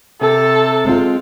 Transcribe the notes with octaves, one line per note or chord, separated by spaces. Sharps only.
C3 A4
G#3 C4 F4